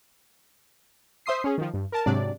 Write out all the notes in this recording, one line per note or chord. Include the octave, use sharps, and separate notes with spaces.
C5 E5 C6 D#6 C7
C#4 G#4
D#3 F3
G2
A#4 A5
G#2 C3 F#3 D4 D5